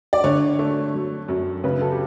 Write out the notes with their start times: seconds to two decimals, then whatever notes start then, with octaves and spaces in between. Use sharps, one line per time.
0.13 D5
0.24 D3 C#5
0.59 A3
0.94 F#3
1.28 F#2
1.64 C#3 B4
1.81 A4
1.91 G4